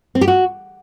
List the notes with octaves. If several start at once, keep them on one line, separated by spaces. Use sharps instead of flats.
C4
G4
F#4